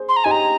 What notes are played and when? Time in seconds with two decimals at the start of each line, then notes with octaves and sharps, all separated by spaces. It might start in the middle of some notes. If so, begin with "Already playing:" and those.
Already playing: G#4 C5
0.09 C6
0.16 A#5
0.24 D#4 G4 G#5
0.31 A#5